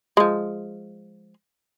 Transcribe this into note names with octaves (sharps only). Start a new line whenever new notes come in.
F3 G#3